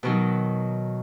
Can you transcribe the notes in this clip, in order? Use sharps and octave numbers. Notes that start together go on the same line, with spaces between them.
B2 D#3 F#3